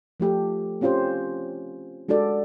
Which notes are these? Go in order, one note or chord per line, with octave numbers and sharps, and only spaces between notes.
F3 A3 G4 A4
C4 C#4 F4 G4 C5
G#3 D4 F#4 A4 D5